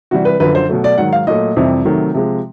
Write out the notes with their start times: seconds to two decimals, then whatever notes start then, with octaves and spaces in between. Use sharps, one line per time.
0.11 C3 E3 G3 F#4
0.25 B4
0.40 F#2 D3 F3 B4
0.55 C5
0.69 B2 F#3 A3
0.84 D5
0.98 G#2 D#3 F#3 F#5
1.13 F5
1.27 A#2 F#3 A3 D#5
1.57 F2 C3 E3 G3
1.85 C3 D#3 F#3 A3
2.14 C3 F3 G#3